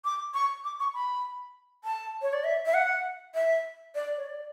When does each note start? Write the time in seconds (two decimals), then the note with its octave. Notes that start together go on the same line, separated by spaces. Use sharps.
0.05 D6
0.34 C#6
0.64 D6
0.80 C#6
0.94 B5
1.84 A5
2.22 C#5
2.33 D5
2.44 E5
2.66 E5
2.74 F#5
3.35 E5
3.95 D5
4.17 C#5
4.25 D5